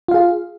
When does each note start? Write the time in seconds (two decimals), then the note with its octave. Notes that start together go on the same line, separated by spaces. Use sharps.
0.08 F4
0.11 F5
0.14 G#4